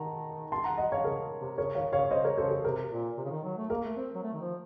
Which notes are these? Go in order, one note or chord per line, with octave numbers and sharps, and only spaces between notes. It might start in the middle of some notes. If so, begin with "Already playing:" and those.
Already playing: D#3 F#5 A5 A#5
A5 C6
F#5 A#5
D#5 F#5
C#5 F5
C#3 A#4
C3
C#3 A#4 C#5
D#3 C#5 F5
C#3 C#5 F5
C#5
C#3 C5 D#5
A#4 C#5
C#3 A4 C5
A4
C3 A#4
A#2
C3
C#3
D#3
F#3
A3
A#3 A#4
A3
C4
F#3
A3
D#3
F3